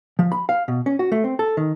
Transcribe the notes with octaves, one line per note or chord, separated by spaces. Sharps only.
F3
B5
F5
B2
C#4
F#4
A3
C4
A4
D#3